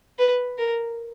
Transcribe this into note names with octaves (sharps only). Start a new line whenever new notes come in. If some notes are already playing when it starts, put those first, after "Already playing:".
B4
A#4